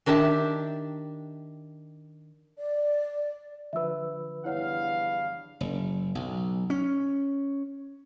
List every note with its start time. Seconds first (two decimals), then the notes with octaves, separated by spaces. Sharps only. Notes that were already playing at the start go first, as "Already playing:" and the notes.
0.06 D#3 D4 G4 E5 A5
2.58 D5
3.73 D3 F3 B4 E5 E6
4.45 E2 G2 E4 C#5 F5 F#5
5.61 F#1
6.15 B1
6.70 C#4